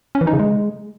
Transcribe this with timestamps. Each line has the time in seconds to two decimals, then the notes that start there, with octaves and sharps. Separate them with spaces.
0.15 C#4
0.21 E3
0.27 D#4
0.33 C#3
0.39 G#3